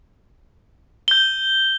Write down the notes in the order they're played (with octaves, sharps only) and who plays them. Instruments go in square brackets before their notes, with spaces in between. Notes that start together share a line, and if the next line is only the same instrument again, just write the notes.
[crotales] G6 G7